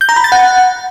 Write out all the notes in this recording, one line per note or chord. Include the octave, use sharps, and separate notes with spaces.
G6
A#5
B5
A6
F#5